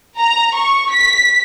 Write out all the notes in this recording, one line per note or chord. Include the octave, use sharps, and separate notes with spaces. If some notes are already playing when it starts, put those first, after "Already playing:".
A#5
C#6
B6